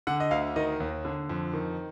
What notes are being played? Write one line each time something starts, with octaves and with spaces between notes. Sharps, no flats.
D3 F#5
D#5
D2 F5
D#3 D#5
D#2
D3
F2
D#3